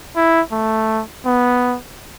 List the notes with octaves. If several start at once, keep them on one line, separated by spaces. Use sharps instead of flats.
E4
A3
B3